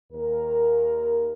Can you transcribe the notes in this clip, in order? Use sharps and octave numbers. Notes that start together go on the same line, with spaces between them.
D#2 A#4